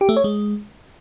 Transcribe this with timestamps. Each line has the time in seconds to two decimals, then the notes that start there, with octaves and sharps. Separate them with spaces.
0.01 G4
0.09 A3
0.16 C#5
0.24 G#3